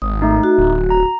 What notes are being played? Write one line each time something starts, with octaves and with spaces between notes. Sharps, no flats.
G#1 D#6
A3 D#4
F#4
D1
A#5